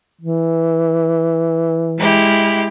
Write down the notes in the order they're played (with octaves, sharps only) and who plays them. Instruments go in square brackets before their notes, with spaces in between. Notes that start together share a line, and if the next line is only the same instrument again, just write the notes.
[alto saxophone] E3
[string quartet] G#3 E4 G4